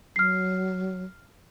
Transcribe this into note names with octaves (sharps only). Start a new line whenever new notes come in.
F#3 F6 C7